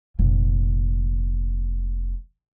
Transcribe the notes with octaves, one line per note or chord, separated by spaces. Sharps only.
F1 A#2